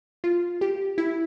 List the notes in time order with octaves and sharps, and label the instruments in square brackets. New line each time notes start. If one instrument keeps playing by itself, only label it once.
[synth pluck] F4
G4
E4